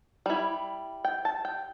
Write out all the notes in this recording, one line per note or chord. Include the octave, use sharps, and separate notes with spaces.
G3 E4
G5
A5
G5